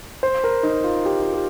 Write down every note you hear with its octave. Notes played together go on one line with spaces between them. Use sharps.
C5
A#4
D#4
F4
G4
F4
G4